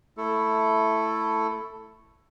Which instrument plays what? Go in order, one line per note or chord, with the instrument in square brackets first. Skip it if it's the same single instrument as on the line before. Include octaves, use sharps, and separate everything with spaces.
[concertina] A3 E4 A4